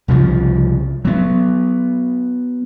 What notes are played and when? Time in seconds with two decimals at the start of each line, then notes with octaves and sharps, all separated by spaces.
0.08 C2 C#3 F3
1.05 F#3 B3